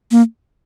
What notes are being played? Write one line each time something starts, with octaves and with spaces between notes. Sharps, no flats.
A#3